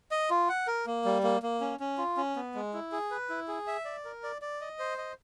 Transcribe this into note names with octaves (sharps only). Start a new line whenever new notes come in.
D#5
F4
F#5
A#4
A#3
G3
A#3
A#3
C#4
C#4
F4
C#4
B3
G#3
E4
G#4
B4
E4
G#4
E5
D5
A#4
D5
D5
D#5
C5
D#5